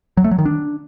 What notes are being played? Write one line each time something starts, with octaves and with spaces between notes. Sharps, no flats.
F#3
A3
F#3
D#3
D4